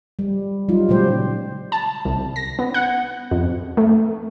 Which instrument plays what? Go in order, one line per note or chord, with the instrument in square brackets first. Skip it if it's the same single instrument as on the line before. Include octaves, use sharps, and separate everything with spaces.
[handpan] G3
F#3 G3 D#4 F4
A#2 C#3 F#3 G#3 G4 C5
[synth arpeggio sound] A5
C2
A#6
B3
F#5
F2
A3